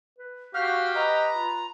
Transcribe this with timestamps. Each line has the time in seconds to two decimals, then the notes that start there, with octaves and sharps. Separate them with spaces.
0.18 B4
0.54 F#4 G4 F5 F6
0.95 B4 D#5 A#5
1.33 F4